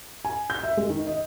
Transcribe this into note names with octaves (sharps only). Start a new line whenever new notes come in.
G#5
G6
E5
G#3
D#3
D#5